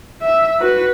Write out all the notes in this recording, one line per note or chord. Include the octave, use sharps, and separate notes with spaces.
E5
F#4 B4